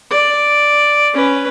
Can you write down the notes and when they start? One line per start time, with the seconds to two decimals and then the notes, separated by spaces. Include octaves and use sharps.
0.11 D5
1.14 C#4 B4